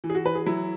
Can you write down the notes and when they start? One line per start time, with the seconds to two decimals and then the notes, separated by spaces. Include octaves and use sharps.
0.04 E3
0.10 G#4
0.15 F#4
0.25 E3 B4
0.35 G#4
0.46 F#3 E4